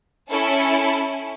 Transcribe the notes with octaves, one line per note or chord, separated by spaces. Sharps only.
C#4 E4 A4